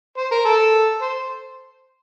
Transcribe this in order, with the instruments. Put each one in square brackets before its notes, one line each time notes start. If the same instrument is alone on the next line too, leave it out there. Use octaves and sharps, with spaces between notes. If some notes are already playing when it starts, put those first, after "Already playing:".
[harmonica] C5
A#4
A4
C5